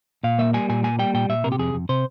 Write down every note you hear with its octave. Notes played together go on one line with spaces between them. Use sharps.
A#2 F5
A#3 E5
G3 G#5
A#2 G#5
A#3 G#5
G3 G5
A#2 G5
A#2 E5
C3 A#4
G4
F2 G#4
F2
C3 C5